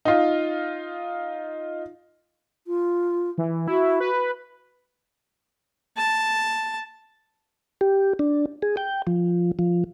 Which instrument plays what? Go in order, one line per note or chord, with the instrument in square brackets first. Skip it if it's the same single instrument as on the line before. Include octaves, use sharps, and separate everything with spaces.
[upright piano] D#4 F4
[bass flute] F4
[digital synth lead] E3
[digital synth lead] E4 [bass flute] F#4
[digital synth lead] B4
[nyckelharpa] A5
[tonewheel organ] G4
D4
G#4
G5
F3
F3